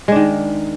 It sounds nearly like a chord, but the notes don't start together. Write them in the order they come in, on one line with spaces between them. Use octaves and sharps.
G#3 D4 D#3